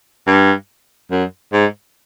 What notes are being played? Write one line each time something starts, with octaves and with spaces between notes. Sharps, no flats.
G2
F#2
G#2